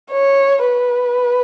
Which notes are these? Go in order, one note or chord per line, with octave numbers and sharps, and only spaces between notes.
C#5
B4